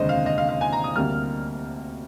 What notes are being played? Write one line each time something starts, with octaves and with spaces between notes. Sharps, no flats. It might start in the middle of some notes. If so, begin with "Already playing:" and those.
Already playing: F1 D#2 D3 G#3 C5 D#5
F5
D#5
F5
F5
G#5
A#5
D#6
D2 C3 G3 A#3 F6